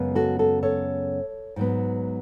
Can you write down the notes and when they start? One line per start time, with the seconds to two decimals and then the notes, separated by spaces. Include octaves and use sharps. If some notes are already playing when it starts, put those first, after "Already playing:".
Already playing: F#2 C#3 G#3 B3
0.15 F#4 A4
0.39 F#4 A4
0.63 A4 C#5
1.56 G#2 F#3 B3